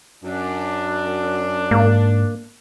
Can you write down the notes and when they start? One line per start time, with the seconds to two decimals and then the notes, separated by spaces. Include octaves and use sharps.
0.24 F#2 D4
1.71 G#2 A#3